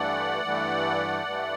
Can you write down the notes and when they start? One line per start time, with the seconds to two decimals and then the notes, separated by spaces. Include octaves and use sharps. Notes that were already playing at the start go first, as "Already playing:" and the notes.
Already playing: G2 E3 A3 D5 F#5
0.43 G2 E3 A3
1.25 G2 E3 A3